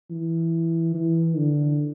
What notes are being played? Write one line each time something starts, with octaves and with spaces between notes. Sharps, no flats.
E3
E3
D3